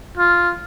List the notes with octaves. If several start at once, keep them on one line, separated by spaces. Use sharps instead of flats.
F4